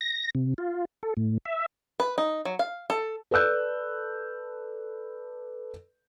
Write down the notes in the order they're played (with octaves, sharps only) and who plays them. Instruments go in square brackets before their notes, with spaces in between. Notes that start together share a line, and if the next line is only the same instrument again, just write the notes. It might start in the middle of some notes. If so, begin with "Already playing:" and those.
[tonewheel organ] A#6
C3
F4
A4
A2
E5
[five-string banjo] B4
D#4
F#3
F5
A4
[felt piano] A4 B4 D5 E6 F#6 G6